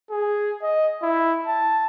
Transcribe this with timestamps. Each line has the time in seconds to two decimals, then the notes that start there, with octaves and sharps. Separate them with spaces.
0.11 G#4
0.62 D#5
1.02 E4
1.47 A5